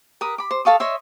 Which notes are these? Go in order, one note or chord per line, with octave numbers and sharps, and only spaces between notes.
A#4 B4 D#6
B5 D6
C5
A4 F5 C#6 D#6
C#5 D#5 E5 C6